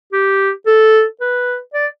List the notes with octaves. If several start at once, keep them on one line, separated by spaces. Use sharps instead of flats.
G4
A4
B4
D5